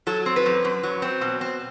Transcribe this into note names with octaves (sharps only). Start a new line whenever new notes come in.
F#3 A4
C4
B4
F#2
F#2
F#3
C4
B2
C4